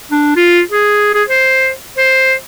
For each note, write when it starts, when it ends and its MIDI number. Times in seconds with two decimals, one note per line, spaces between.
0.12 0.34 62
0.36 0.61 65
0.71 1.14 68
1.15 1.24 68
1.29 1.71 72
1.98 2.34 72